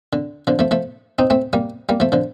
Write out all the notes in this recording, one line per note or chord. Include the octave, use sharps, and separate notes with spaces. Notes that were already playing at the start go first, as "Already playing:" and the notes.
D3
D3 F3
F3 A3
F3 A3
C4 D#4
A3 C4
G3 A#3
G3 A#3
F3 A3
D3 F3